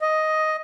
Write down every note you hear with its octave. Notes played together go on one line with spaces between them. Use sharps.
D#5